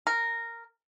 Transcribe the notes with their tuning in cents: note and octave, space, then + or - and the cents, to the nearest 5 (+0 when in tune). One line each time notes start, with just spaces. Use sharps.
A#4 -10